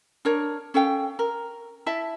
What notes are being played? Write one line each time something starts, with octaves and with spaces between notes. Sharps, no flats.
D4 A#4 C#5
C#4 A4 F5 G5
A#4
E4 E5 A5